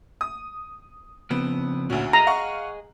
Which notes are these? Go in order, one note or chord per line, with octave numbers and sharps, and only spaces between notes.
D#6
C#3 F3 B3 C4
D2 A#2 C#4 E4 F#4
G#4 D#5 A#5
F5 F#5 C#6